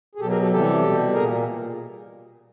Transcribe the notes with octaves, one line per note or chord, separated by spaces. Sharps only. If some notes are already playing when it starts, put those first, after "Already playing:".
G#4
B2 F#3 G4 A4
G#4 A#4
G4 A4
C3 E3 G3 G4 A4
B2 G3
A#2 G#4 A#4